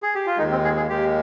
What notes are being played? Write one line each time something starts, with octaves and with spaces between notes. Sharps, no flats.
G#4
G4
F4
D#2 D#3 G#3 D#4
C4
G#4
G#4
D#2 D#3 G#3 G4